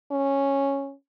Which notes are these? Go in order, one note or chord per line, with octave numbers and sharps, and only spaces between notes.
C#4